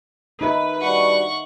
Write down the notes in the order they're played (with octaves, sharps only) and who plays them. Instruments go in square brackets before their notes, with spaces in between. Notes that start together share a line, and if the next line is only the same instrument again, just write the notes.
[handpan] D#4 A#4 E5 [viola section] B4
[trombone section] G3 D4 F#4 [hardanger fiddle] F#5 C#6